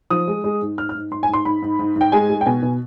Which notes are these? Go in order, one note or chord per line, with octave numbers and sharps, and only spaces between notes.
F3 D#6
G#3
G#3
G#2
G#2 F6
F6
G#2
G#2 C6
G#5
G#2 C6
G#2 B5
G#2
G#2
G#2 G5
G#3 G#5
G#3
G5
B2 G#5
B2